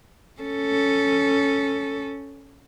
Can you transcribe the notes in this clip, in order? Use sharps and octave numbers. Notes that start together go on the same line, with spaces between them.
C#4 A4